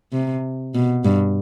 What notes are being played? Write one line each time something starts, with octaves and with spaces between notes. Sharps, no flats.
C3
B2
G2